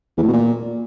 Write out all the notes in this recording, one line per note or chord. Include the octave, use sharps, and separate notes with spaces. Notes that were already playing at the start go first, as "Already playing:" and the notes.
E2
A2
B2
A#2